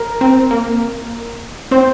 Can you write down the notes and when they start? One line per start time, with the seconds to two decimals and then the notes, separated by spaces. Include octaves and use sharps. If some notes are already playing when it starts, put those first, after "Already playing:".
Already playing: A#4
0.21 C4
0.51 A#3
1.71 C4 C5